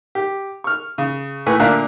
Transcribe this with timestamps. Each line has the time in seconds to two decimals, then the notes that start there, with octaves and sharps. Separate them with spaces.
0.15 G4
0.64 C#6 F6
0.98 C#3
1.46 A2 A3 B4 G#5 C#6
1.59 A#2 D3 A#4 E5 F5 F#6